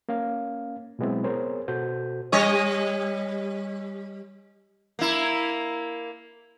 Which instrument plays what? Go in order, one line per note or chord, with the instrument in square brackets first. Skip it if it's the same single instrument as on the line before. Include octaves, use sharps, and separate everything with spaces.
[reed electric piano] A#3 C#4 F5
B2 F#3 G#3 B3 C4 E4
B3 G#4 A#4 C5 C#5
B2 F#4 A4 C5 G6
[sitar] G3 C#5 D#5
A#3 E4